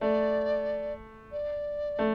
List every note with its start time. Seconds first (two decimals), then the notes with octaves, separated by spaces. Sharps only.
0.01 A3 D5
1.32 D5
1.99 A3